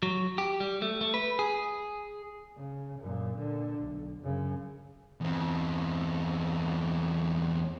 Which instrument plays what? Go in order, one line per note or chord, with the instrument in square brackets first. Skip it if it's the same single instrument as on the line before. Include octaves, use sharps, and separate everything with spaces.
[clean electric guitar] F#3
G4
G3
A3
A3
B4
G#4
[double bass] C#3
F#2 A#2
A#2 D3
B1
F#2 C#3
[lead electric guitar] E2 C4